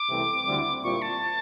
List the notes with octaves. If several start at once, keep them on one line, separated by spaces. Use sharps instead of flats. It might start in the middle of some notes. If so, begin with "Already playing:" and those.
Already playing: D6
C2 C3 E3 A3 C4
D2 D3 G3 C4 E4
A#2 G3 C4 E4 C#6
A5